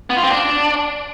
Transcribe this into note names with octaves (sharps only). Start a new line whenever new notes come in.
B3
F4
C4
D4